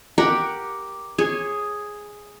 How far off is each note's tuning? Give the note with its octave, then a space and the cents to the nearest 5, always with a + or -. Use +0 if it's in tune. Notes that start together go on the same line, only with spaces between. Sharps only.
G4 +0 A#4 +5 F#5 -5
G#4 +0 C#5 -25